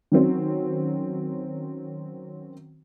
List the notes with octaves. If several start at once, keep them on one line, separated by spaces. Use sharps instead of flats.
D#3 F#3 C4 C#4